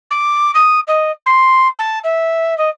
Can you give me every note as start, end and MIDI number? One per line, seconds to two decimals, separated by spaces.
0.11 0.52 86
0.54 0.80 87
0.87 1.11 75
1.26 1.68 84
1.79 1.99 81
2.04 2.57 76
2.58 2.69 75